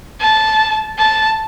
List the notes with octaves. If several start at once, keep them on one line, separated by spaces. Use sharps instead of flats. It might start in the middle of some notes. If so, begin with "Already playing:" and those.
A5
A5